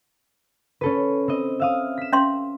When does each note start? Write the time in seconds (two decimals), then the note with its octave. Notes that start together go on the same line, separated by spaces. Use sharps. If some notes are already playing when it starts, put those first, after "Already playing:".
0.81 C#4 A4 B4
1.28 C4 D#5
1.60 E5 F5 D#6
1.97 B6 E7
2.13 C#4 E5 C6